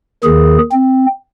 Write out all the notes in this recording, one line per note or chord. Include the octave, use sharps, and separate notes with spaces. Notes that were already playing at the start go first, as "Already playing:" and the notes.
D#2 D#3 G#4
C4